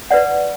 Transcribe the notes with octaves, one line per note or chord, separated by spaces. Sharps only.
B4 D5 F#5